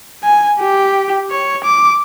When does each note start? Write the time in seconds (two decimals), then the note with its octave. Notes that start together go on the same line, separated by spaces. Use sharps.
0.24 G#5
0.60 G4
1.31 C#5
1.64 D6